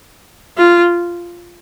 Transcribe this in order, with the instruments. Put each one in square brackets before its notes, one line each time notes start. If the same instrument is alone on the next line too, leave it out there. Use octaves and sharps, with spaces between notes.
[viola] F4